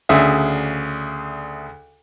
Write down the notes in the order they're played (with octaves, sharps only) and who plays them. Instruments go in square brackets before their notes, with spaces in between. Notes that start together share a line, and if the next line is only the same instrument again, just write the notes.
[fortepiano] D2 C#3 D4 G#4 E5